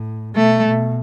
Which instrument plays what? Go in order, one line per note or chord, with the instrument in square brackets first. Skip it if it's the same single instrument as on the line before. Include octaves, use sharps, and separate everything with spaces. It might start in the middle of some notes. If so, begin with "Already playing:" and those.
Already playing: [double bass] A2
[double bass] B2 [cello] A3
[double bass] B2